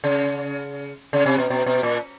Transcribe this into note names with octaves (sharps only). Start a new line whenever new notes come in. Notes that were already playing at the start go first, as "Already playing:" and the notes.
C#3
C#3
C3
B2
B2
B2
A#2